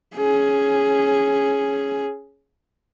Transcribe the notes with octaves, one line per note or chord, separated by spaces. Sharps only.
C#4 G#4